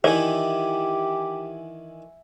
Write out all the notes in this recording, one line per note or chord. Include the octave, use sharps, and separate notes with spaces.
D#3 E3 G4 D5 E5 F#5 G#5